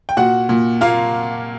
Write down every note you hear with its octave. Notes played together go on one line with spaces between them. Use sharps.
G5
A#2 F#4 F#5
A#2
A#3 F4 F5